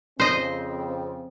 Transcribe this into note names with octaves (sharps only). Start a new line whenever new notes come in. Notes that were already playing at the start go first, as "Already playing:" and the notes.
F2 C#3 C4 C5 D#5